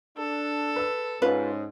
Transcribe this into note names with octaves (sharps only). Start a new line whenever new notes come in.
D4 A4
B4 E6
G#2 C#4 F4 B4